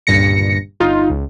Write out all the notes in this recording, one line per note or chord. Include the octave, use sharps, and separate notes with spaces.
G1 C#2 G2 A#2 A#6 C#7
G1 D#4 F4
C#2